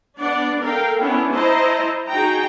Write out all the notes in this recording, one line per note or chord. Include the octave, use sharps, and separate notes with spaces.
B3 D4 D5 F#5
A4 A#4 F5 G5
B3 C#4 D4 E4
E4 C5 D#5 A5 A#5
D#4 F#4 G#4 G5 A#5